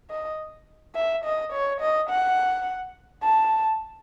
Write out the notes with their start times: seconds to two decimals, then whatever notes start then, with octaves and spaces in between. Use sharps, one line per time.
0.10 D#5
0.95 E5
1.25 D#5
1.53 C#5
1.81 D#5
2.10 F#5
3.23 A5